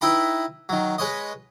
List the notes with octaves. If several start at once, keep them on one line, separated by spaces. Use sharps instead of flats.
D#4 E4 B4 G5 A#5 B5
D#3 F#3
G#3 B4 C#5 D#5